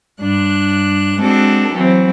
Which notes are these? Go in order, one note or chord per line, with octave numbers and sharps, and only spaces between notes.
G2 D4 F#6
G#3 C4 D4 F#4 A4
E3 F#3 C4